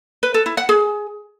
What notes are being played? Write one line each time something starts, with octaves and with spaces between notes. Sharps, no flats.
B4
A4
E4
F#5
G#4